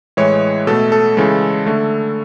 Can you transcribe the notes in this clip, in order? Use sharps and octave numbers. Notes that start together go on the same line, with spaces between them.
A2 E3 G#3 C#5
B2 A3 A4
A4
C#3 E3 G#3
D3 A3